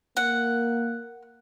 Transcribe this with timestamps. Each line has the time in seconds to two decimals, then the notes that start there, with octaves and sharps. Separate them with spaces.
0.17 A#3 F#5